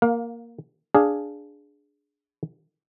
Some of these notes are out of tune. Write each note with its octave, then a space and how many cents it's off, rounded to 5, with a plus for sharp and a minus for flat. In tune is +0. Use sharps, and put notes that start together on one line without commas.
A#3 +0 F5 +25
D4 -5 G#4 +0 F5 +0